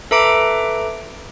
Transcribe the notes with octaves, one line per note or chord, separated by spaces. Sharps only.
A4 B4 E5 A#5 D6 D7